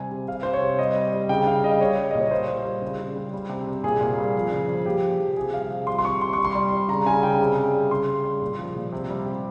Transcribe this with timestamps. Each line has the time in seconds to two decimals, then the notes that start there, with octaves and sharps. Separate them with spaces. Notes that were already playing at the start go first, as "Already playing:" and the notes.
Already playing: C3 G3 G#5
0.11 C3
0.28 C3 F5
0.43 C3 C5
0.53 C#5
0.62 C3
0.78 G3 D#5
0.96 G3
1.13 G3
1.29 C#3 G5
1.47 C#3 F5
1.63 G3 D#5
1.80 G3 C#5
1.98 G3
2.11 A#2 D#5
2.21 C#5
2.31 G3 C5
2.48 G3
2.65 G3
2.82 C#3
2.99 C#3
3.16 G3
3.34 G3
3.49 C3
3.67 C3
3.83 A#2 G#4
4.01 A#2
4.18 G3
4.35 F3
4.52 C#3
4.69 F3
4.86 A#2 G4
5.02 F3
5.20 F3
5.36 C3 G#4
5.53 G3 F5
5.70 C3
5.87 G3 C6
5.99 C6
6.04 C3 C#6
6.21 C3 C6
6.33 G3 C#6
6.45 C6
6.55 G3
6.72 G3
6.88 C#3 A#5
7.06 C#3 G#5
7.23 C#3 G5
7.40 C3
7.57 C3
7.74 G3
7.91 C#3 C6
8.08 G3
8.24 G3
8.42 A#2
8.59 F3
8.75 A#2
8.92 C3
9.10 G3
9.26 C3